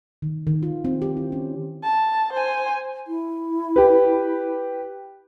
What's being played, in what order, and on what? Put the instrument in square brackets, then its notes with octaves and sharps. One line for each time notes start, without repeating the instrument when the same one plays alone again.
[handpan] D#3
D#3
F4
C4
G4
E4
C#4
[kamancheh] A5
C5 G#5
[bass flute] E4
[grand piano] G4 B4